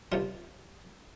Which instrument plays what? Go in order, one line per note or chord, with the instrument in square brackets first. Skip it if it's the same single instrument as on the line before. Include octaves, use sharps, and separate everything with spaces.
[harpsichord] C#2 C3 G3 F4